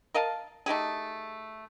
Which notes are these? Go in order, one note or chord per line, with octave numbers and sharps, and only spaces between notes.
A#4 D#5 F5 A5
A3 D#4 G4 G#4